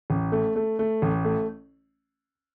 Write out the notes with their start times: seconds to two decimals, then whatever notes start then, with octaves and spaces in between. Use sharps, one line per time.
0.10 A1
0.32 A3
0.56 A3
0.79 A3
1.02 A1
1.25 A3